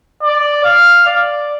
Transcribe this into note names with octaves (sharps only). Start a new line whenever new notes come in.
D5
F5
D5